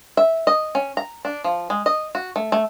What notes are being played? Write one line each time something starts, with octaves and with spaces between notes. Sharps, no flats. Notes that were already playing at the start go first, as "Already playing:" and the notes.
E5
D#5
C#4
A#5
D4
F3
G#3
D#5
F#4
A3
A3